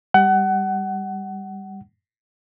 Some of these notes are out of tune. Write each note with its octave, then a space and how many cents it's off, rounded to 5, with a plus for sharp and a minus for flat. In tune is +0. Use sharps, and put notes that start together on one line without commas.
G3 +10 F#5 +25